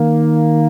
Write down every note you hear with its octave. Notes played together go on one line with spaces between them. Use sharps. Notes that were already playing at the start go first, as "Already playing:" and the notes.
Already playing: D#3 A#3